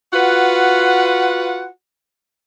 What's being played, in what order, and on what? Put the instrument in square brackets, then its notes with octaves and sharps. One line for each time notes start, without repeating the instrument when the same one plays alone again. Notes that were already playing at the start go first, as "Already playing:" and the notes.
[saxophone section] F4 F#4 B4 F#5